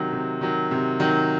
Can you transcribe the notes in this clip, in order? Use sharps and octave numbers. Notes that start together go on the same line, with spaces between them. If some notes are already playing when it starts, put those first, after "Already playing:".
Already playing: C3 D#3 F#3
C3
D#3 F#3
C3
D#3 F#3